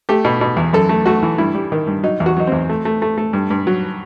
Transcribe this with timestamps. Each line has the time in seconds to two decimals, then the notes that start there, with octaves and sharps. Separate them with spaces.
0.09 A3 G4
0.25 B2
0.41 B2
0.57 E2
0.73 F#2 A4
0.89 A3
1.06 A3 F#4
1.23 E3
1.38 G2 E4
1.55 G3
1.72 D#3
1.87 G2
2.03 F#3 D#4
2.20 E2
2.26 F#4
2.37 F#3 D#4
2.47 E2 C4
2.69 A3
2.85 A3
3.02 A3
3.18 A3
3.33 G2
3.50 G2
3.67 F#3